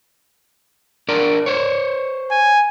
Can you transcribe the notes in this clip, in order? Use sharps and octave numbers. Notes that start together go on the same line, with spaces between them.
D4 A#4 D5
C5 C#5
G#5